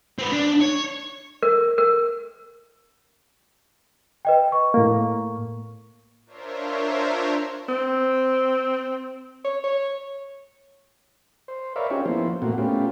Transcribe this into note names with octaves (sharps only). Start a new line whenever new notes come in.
C4 B4
D4
C#5
A#4
A#4
B4 D#5 G5
C#6
A2 A#3
D4 F4 A#4 C5 C#5 E5
C4
C#5
C#5
C5
A#4 B4 C#5 D5 E5 F5
C#4 D#4 F4 G4 G#4 C#5
F3 A#3 B3 E4 C5
A#2 A3 A#3 C4 F#4
A3 B3 C#4 F4 G4